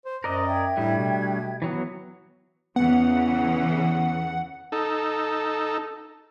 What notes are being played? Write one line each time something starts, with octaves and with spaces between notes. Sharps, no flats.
C5
F#2 A#4 C5 D5 D#5 F#6
E5 G5 G#6
A2 G3 A3 D4
B2
E3 F#3 B3
E2 C#3 E3 B3 F#5
D#4 A4